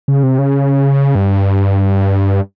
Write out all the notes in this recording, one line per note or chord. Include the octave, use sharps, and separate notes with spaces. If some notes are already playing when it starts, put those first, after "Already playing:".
C#3
C3
C#3
G2